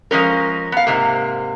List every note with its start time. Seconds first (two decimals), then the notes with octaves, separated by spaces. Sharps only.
0.11 F3 G#3 C#4 A#4
0.72 B3 F5
0.87 G#2 C3 A#3